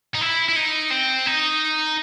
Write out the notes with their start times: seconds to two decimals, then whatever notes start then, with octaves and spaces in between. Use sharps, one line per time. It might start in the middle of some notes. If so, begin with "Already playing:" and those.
0.15 D#4
0.21 E4
0.49 E4
0.56 D#4
0.91 C4
1.26 D#4